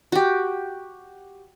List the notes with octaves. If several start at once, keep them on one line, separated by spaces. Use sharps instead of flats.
F#4 G4